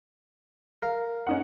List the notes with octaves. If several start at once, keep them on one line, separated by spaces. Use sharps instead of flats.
A#4 F5
C#4 D#4 F#5